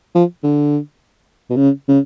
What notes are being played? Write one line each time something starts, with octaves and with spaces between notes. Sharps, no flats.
F3
D3
B2
C#3
C#3